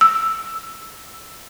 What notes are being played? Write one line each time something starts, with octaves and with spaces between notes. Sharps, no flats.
E6